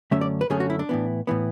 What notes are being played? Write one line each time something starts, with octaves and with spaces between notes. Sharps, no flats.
F#2 D3 A3 C#4 E5
D5
B4
F#2 D3 A3 C#4 G#4
F#4
E4
D4
A2 E3 B3
A2 E3 B3